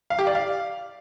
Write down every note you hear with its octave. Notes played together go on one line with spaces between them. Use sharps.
F5
G4
D5
F5